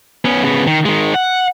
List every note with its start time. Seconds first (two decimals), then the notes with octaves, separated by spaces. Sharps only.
0.25 B3 C#4
0.44 C#3 B3
0.67 D#3
0.86 D#3 G#3
1.14 F#5